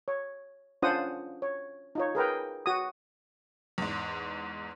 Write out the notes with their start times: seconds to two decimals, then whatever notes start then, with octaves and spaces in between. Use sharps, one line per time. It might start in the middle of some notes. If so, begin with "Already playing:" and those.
0.08 C#5
0.82 C#4 D4 F4 C5 F#5 D#6
1.42 C#5
1.95 D#4 F4 C#5
2.15 G#4 A#4 B4 G5
2.66 F#4 D#6
3.78 E2 G#2